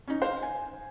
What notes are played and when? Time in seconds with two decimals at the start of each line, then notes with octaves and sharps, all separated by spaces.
0.08 C#4 D#4
0.22 C5 F5
0.42 G#5